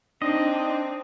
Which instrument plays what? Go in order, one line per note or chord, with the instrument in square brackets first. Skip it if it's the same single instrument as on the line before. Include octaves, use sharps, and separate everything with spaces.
[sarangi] C4 [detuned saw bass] D4 [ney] D#4 [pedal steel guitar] D#5